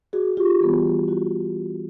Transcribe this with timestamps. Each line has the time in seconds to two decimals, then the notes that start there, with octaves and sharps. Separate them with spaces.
0.13 F#4 G#4
0.37 F4 G4
0.61 E3 G3 B3
1.08 E4 F#4